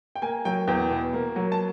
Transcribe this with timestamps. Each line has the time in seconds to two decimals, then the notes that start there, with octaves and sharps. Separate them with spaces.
0.16 G5
0.22 A#3 G#5
0.45 F#3 G5
0.67 E2 G5
0.90 B2
1.13 A#3
1.36 F#3
1.52 A5